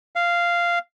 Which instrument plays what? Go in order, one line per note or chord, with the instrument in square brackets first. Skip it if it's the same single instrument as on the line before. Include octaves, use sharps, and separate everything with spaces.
[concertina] F5